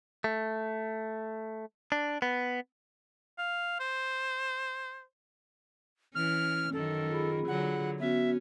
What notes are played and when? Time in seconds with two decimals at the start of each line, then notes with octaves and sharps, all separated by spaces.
0.24 A3
1.92 D4
2.22 B3
3.38 F5
3.80 C5
6.15 E3 C#4 F6
6.73 F#2 D#3 A4
7.09 F4 G#4 B5
7.48 D3 F#3 F#5
8.00 B3 C#4 F#4 E5